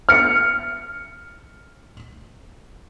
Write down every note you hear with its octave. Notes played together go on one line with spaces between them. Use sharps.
F6 C#7